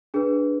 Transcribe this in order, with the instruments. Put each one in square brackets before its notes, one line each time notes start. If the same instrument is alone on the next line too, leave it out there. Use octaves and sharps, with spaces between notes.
[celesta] D4 G#4 B4